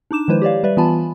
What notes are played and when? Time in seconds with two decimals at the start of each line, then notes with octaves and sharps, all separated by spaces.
0.11 D4 D#4 D6 E7
0.28 D#3 F3 G#3 E4 B4 C5
0.42 G4 C#5 D5 F5
0.63 G3 B4 D5 E5
0.77 E3 B3 F4 G#5 A5 B5